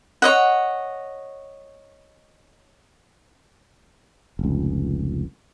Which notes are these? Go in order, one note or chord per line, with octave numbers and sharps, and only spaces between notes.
C#5 D#5 F#5
F1 C#2